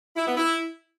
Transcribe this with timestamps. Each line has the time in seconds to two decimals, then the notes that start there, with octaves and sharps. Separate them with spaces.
0.16 E4
0.27 B3
0.37 E4